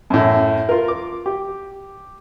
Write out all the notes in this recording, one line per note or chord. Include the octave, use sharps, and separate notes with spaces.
F#2 A2
F4 A#4
D6
G4